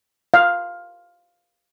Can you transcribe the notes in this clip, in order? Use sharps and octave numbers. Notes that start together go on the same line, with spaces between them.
F5